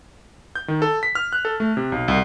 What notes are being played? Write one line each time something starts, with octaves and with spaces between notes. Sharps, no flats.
G6
D#3
A4
B6
F6
F#6
A4
A3
C3
B1
C2